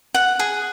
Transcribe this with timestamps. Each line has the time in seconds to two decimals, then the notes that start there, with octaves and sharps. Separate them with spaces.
0.15 F#5
0.39 G#4